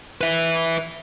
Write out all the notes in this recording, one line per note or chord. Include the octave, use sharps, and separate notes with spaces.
B4 E5